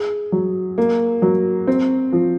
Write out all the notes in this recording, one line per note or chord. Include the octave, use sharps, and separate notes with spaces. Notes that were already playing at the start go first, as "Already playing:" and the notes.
Already playing: G#4
F#3
A#3
F#3
C4
F3